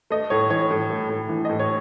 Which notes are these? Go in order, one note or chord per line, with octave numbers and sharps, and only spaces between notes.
A3 D#5
A2 C#5
E3 C#5
A2
A3
A2
E3
A2 D#5
C#5